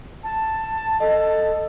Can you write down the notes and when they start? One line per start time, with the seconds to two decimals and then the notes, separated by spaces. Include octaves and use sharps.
0.23 A5
1.00 A4 D#5